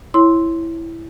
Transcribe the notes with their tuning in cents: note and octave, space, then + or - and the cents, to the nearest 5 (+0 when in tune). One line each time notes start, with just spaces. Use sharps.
E4 +0 C#5 -15 C6 +0